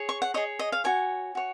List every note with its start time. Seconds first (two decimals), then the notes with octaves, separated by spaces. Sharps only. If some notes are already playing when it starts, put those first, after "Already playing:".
Already playing: G#4 C#5
0.09 C#6
0.22 F#5
0.34 G#4 C#5 D#5
0.59 D#5
0.72 F5
0.84 F#4 C#5 G#5
1.35 F#4 C#5